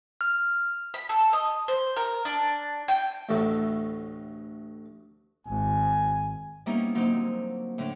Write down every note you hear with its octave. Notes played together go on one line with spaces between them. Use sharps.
F6
B5
A4
D#5
C5
A#4
D4
G5
A1 D2 A2 F#3 A3 E5
G#1 G#5
G3 A#3 B3 C#4 D#4 E4
D3 F#3 A#3 C4 D#4
A2 D3